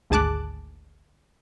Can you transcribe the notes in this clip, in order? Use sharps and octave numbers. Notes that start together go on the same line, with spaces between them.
G#1 D2 G#4 A5 D6 F#6